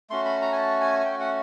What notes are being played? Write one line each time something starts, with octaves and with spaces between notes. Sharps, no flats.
A3 C#4 F#4 C6
B5
A#5
G#5
A5
G#5
G#5
G5
F#5